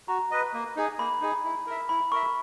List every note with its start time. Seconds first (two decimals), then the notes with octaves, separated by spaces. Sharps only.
0.08 F#4 A#5
0.31 B4 D#5
0.54 A#3
0.76 D#4 G#4
0.99 A#3 B5
1.21 D#4 G#4
1.44 E4
1.67 A#4 E5
1.89 E4 B5
2.12 A#4 E5 C#6